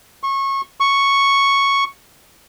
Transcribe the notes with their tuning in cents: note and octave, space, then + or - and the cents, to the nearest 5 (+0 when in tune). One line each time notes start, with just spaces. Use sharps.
C#6 -25
C#6 +0